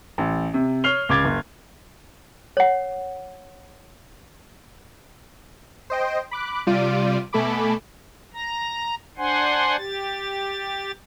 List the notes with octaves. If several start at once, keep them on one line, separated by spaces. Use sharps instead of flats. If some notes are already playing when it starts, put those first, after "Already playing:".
A1
C3
C#5 F6 C7 F7 G7
C#2 D6 G#6 A6
F#1
C#5 F#5
C5 D#5 G5
B5 D6 F#6
C3 G3 F4 D5 D7 D#7
B2 A3 A4 G#5 B5 D6
A#5 A#6
D4 C5 F#5 G#5 C6
G4 A6